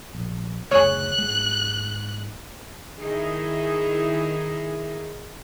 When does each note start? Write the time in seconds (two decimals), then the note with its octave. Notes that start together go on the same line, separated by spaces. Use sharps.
0.15 A#1
0.71 F#1 D2 G#4 C#5 F#6
1.18 G#2 G#3
2.99 D#3 D#4 E4 G#4